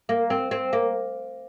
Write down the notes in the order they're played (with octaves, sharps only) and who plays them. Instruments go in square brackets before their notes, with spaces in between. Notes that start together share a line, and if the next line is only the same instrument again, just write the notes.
[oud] A#3
C4
C4
A#3